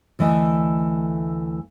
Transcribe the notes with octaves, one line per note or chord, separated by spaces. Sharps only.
D2 E3 A3 D#5